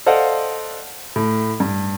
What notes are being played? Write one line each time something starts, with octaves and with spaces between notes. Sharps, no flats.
A4 C5 D5 D#5 F5 F#5
A2
G2